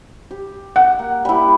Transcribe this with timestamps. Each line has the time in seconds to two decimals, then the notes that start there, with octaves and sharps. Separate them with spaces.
0.31 G4
0.76 F#5
0.99 A#3
1.25 G3 E4